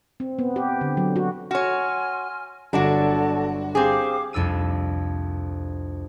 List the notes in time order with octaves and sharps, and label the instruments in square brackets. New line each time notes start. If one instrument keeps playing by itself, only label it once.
[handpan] C4
B3
G4
D3
F#3
F#4
[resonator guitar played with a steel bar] F#4 C#5 [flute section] G#5 C6 F6
[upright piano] G1 [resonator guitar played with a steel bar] F#3 D4 F#4 [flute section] A4 D5 A5
[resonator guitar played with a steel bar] C4 G#4 [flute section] G4 F5 D6
[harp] C2 F2 D4 E6 D#7